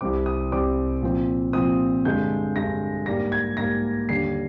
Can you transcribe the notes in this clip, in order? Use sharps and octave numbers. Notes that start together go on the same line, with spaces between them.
C2 C3 G3 C4 D6
D#6
C2 C3 G3 C4 D6
A#2 F3 C4
A#2 F3 C4 D#6
G2 D3 G#3 G6
G2 D3 G#3 A#6
G#2 G3 A#3 A#6
G#6
G#2 G3 A#3 A#6
D#2 D3 G3 C7